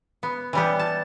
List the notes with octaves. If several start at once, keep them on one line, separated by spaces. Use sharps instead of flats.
B3
E3 G3 B3
A5